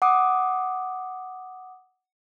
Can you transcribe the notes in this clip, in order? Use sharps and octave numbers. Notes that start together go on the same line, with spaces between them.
F#5 D6 D#6